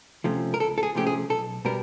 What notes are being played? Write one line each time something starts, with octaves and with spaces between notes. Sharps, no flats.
C3 F3 A3 C#4
A#4
C#2 A4
A4
G#4
C3 F3 A3 C#4 G4
G#4
B1 A4
B2 G3 B3 D4 A#4